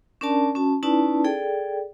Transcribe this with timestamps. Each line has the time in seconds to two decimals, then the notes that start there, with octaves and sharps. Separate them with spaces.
0.21 C#4 D4 A#4 D5 A5
0.55 C#4 F#4 A5
0.83 C#4 D#4 E4 B4 D5 A5
1.24 G#4 A4 D5 G5